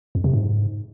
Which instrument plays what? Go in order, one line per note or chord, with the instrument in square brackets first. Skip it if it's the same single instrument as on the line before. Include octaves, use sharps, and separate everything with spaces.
[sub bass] F2
C3
G#2